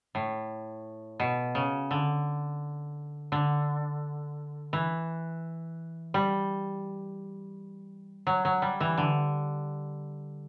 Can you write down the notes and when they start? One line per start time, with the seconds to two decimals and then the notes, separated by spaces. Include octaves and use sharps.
0.15 A2
1.20 B2
1.55 C#3
1.91 D3
3.32 D3
4.73 E3
6.14 G3
8.27 F#3
8.45 F#3
8.62 G3
8.80 E3
8.98 D3